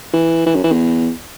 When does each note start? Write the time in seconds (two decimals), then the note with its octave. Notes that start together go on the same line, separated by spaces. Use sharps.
0.14 E3
0.46 E3
0.55 F#2
0.64 E3
0.72 E2